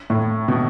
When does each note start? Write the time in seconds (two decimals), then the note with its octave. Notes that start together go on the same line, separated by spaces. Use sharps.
0.10 A2
0.48 B2